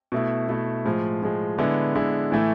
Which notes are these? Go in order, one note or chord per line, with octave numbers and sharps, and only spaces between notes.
B2 A3 E4
B2 A3 E4
A2 F3 G#3
A2 F3 G#3
D3 G#3 B3 E4
D3 G#3 B3 E4
A2 E3 A3 E4